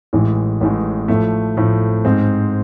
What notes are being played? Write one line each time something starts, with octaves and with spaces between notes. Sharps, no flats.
A1 A2 E3 G#3
A1 A2 E3 G#3
A2 F3 A3
A2 F3 A3
G#2 G#3 C4